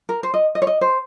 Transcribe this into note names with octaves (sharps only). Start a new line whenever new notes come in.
A#4
C5
D#5
D#5
C#5
D#5
C5